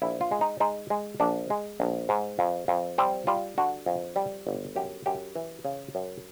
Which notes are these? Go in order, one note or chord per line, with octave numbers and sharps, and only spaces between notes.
A#1 E4
F4
G#3
D#4
G#3 D#4
G#3
A#1 D4
G#3
A#1
G#2
F2
F2
G3 C4
G3 F4
D3 F#4
F2
G3
G1
F#2 G4
F#2 G4
E3
C#3
F#2